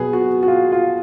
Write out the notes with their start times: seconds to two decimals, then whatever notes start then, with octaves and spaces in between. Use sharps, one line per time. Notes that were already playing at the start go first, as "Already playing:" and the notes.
Already playing: B2 F#3 B3 G#4
0.13 F#4
0.43 F#4
0.48 F4
0.72 F4